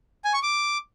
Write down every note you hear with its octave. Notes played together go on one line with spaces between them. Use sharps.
G#5
C#6
D6